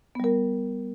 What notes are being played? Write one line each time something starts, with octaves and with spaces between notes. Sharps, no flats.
G3 B3 A#4